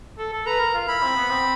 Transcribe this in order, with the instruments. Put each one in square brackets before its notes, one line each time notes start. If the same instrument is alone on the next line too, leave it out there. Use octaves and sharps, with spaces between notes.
[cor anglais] A4
A4
[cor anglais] B4 [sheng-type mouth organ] A#5
[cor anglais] A#4
F4
[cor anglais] E4 [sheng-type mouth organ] B5
[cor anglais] C4
B3
C4